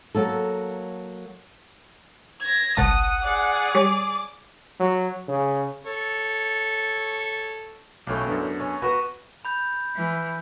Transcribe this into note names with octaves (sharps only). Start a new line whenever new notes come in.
F#3 A#3 A4
G#6 A#6
G1 C2 F#5 A5 D#6
G#4 D5
G3 C#5 D6
F#3
C#3
A4 C#5
B1 A2 C#4 G5 C#6 D6
F#2 D3 B3
C#4
B3 F#4 B4 A#5
B5 G6
E3